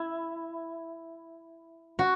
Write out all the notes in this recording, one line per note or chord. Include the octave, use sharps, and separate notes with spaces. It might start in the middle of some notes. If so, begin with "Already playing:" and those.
Already playing: E4
F#4